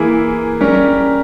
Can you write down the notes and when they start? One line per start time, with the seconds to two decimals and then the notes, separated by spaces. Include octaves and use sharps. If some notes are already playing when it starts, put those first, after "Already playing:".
Already playing: E3 A#3 E4 G#4
0.60 G3 C#4 G4 A#4